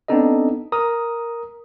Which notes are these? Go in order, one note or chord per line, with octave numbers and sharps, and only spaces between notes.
B3 C4 D4 D#4 A4 D#5
A#4 A#5 D#6